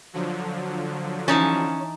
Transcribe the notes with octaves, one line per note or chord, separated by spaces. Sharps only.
D3 F3 F#3
E3 C#4 D#4 A5